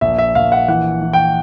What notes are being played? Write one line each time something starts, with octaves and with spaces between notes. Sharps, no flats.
A#1 E5
E5
A#1 F5
F#5
E3 F#5
E3
G5